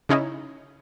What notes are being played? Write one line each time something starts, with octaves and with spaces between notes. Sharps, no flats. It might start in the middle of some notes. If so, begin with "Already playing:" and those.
C#3 C#4 D#4 E4